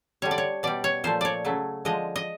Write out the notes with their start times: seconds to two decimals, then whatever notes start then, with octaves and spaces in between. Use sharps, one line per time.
0.22 D3 G3 C#5
0.31 D5
0.38 C#5
0.63 B2 G3 D5
0.84 C#5
1.04 A#2 F3 A3 C5
1.21 C#5 D5
1.45 C#3 F#3 A3
1.85 D3 F3 G#3 D#5
2.16 D#5